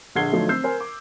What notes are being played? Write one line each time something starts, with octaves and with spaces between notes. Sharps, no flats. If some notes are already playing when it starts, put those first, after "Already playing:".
A#1 D3 F#5 G#6 C7 G7
D3 F3 F#3 A3 D#4
C4 E6 G6 C7
A#4 C5 G#5
D6